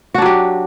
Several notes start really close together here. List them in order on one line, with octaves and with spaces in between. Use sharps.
F#4 D4 F#3 G4